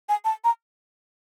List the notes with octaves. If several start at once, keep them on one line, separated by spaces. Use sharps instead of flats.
G#5
A5
A#5